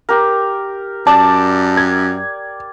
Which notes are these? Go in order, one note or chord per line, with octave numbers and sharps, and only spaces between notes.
G4 A#4
F#2 D5 A5
G#6